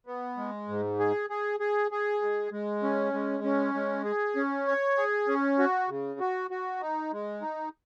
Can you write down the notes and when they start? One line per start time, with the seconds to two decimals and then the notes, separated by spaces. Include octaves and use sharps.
0.07 B3
0.37 G#3
0.68 G#2
1.00 G#4
1.30 G#4
1.60 G#4
1.91 G#4
2.22 G#3
2.52 G#3
2.83 C#4
3.14 G#3
3.44 C#4
3.74 G#3
4.05 G#4
4.36 C#4
4.67 C#5
4.97 G#4
5.28 C#4
5.59 F#4
5.89 C#3
6.20 F#4
6.51 F#4
6.81 D#4
7.12 G#3
7.42 D#4